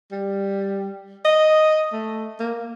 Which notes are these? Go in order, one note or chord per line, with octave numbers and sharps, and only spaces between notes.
G3
D#5
A3
A#3